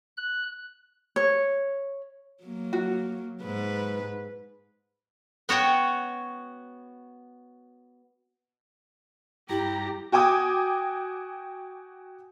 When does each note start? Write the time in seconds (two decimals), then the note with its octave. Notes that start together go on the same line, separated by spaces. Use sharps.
0.17 F#6
1.16 C#5
2.44 F#3 A#3
2.73 F#4
3.42 G#2 B4
5.49 B3 F#4 C#5 G5
9.49 G2 E4 G4 A#5
10.12 F#4 G5 G#5 D6 D#6